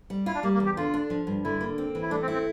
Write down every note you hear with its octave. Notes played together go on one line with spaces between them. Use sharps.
G3
E4 F4
D4
G3 A#3
A#3
E2
G4
D3 F4
D4
F3
G2
D3 E4
A#3
C4
E3
E4
A3 D4
C4
E4
C4